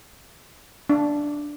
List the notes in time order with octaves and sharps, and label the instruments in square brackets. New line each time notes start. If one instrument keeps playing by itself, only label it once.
[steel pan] D4